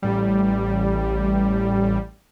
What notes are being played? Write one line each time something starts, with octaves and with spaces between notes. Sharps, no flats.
A1 G3